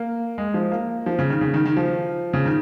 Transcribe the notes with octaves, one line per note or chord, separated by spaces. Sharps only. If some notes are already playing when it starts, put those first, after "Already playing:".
Already playing: A#3
G#3
F3
A#3
F3
C#3
D#3
C#3
D#3
D#3
F3
C#3
D#3